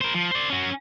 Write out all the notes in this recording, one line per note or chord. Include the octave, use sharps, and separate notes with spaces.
A#4 C5
F3
C5 D5
C#4 F#4